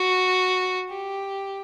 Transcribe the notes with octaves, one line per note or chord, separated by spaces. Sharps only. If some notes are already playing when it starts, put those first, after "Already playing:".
Already playing: F#4
G4